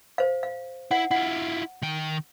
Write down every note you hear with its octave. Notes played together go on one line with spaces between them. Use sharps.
C5 F5
F5
E4 F#5
E4 F4 F#5
D#3 G5